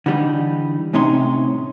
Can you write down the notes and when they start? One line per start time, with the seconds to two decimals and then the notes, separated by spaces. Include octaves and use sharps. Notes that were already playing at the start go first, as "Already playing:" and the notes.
0.06 D3 E3 G3 C4 D#4
0.93 C2 A2 C3 C#4 D#4 C6